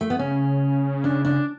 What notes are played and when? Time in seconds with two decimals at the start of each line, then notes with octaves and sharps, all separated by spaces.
0.01 A3
0.10 B3
0.19 C#3 C#4
1.04 D4
1.25 D4